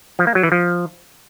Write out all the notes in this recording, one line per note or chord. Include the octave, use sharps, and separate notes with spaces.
F3
A#3
F#3
E3
F3